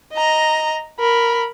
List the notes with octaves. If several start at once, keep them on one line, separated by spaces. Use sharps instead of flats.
D#5 A#5
A#4 B5